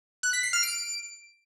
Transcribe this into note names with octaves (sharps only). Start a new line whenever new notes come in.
F#6
B6
C7
F6
D7